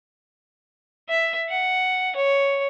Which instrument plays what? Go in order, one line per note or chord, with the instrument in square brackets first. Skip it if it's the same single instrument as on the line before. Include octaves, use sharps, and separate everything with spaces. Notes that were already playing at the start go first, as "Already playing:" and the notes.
[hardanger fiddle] E5
F#5
C#5